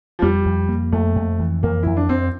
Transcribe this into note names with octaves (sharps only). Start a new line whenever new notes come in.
F3
F2 G3
F2
A#3
F2 A3
F2
E3
F2 A#3
F2 E4
D4
F2 C4